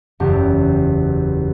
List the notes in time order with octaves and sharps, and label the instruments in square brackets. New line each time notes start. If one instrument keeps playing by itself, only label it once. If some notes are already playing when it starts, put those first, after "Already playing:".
[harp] F#1 E2 G4